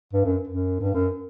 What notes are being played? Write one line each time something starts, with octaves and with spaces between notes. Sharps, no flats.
G2
F#2
F#2
G2
F#2